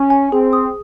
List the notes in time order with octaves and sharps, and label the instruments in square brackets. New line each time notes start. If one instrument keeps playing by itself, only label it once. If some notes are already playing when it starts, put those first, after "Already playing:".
Already playing: [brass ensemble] C#4
[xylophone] G#5
[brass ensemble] C4 [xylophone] G#4
[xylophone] D#6